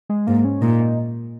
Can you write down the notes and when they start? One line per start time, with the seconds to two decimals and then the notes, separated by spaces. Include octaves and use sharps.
0.09 G#3
0.27 G#2 A#3
0.45 C#4
0.62 A#2 D#4